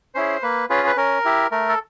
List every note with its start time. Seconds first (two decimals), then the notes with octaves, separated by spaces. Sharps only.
0.15 C#4 E4 G#4 C5
0.43 A#3 B4
0.70 C#4 F4 G#4 B4
0.87 B4
0.97 C#4 A#4
1.25 E4 G4
1.51 A3 A#4
1.69 A4